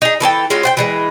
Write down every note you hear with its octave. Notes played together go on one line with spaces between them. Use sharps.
D#4 G#4
E3 A4 C#5 G5
G#3 C#4 F4 F#4
C5 F#5 G5
E3 G3 G#3